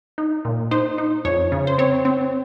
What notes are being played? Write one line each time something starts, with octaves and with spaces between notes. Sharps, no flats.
D#4
A#2
D#4 C5
D#4
F2 C#5
C#3
C5
C4 C#5
C4